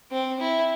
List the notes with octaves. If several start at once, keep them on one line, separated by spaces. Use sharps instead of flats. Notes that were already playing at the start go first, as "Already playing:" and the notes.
C4
E4